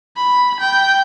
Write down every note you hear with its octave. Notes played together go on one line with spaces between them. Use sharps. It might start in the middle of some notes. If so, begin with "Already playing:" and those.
B5
G5